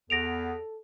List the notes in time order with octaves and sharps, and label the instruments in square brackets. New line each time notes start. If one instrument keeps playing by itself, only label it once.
[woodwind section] E2 B3 [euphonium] A4 [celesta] A#6 D7 F7